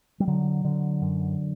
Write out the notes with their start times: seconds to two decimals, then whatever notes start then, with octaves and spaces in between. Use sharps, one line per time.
0.20 G3
0.27 D3 F#3
0.64 D3
1.01 F#2